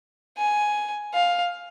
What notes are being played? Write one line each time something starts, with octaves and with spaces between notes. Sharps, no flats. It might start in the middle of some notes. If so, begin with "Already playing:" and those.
G#5
F5